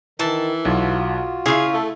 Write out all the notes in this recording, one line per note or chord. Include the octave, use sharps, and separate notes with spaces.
D#3 E3 A5
B1 F4 F#4
C#3 E4 F4 G#4
A3 A4